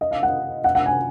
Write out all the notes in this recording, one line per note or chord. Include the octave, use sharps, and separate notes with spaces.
D#5
F5
F#5
F#5
F#5
G#5